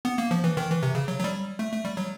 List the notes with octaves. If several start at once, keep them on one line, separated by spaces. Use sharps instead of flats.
B3
A#3
F3
E3
D#3
E3
C3
C#3
F#3
F#3
G3
A3
A3
G3
F#3